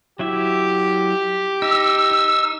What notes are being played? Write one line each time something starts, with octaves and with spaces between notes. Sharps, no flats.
F#3 E4 G4 E5
D#4 E6
D#4